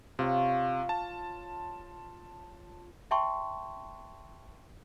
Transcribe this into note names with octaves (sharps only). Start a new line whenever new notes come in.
C3 F4 C#5
A5
E5 G5 A5 C6 C#6